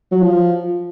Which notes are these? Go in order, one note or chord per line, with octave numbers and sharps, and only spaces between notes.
F#3
F3